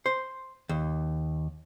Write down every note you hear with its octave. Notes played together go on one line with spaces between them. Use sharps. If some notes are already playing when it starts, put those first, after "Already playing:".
C5
D#2